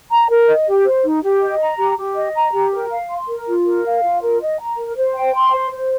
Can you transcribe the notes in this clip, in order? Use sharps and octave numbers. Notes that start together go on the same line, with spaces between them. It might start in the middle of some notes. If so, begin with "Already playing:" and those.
A#5
A#4
D#5
G4
C5
D#4
G4
D#5
A#5
G4
G4
D#5
A#5
G4
A#4
F5
C6
A#4
F4
A#4
F5
F4
A#4
D#5
A#5
A#4
C5
G5
C6
C5
C5